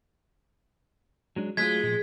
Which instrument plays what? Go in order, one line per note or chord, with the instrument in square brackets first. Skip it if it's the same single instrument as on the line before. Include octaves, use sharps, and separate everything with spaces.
[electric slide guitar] F#3 G#3 D4
[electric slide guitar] F#3 A3 F4 [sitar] G#3 [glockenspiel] G#6 B6
[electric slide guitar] A#2 F3